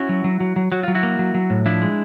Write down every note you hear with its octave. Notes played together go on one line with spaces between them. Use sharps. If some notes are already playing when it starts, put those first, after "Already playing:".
Already playing: C#4 E4 F#4
F#3
F#3
F#3
F#3
F#3 F#4
F#3 F4
E4 F#4
A#3
F#3
F#3
A2
F3 D4 E4
G#3